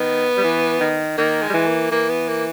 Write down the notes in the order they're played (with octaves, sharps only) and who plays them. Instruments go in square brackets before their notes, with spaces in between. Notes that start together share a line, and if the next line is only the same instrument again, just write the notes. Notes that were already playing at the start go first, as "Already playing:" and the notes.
Already playing: [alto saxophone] D#3 [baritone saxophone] B3
[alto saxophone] G3
E3
D#3
[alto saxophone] D#3 [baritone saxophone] A#3
[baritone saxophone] G#3
[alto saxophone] G3
E3
[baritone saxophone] A#3
[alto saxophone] E3 [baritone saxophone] A#3
[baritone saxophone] B3
A#3